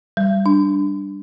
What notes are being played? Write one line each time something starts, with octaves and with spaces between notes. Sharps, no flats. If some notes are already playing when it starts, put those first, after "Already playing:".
G3
D4